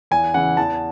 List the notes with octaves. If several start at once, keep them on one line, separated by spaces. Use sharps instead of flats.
E2 G#5
C#3 E3 F#5
E2 A5